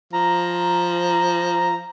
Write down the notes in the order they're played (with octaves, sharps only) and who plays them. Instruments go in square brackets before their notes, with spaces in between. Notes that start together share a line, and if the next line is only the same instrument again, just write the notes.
[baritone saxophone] F3 [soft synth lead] A#5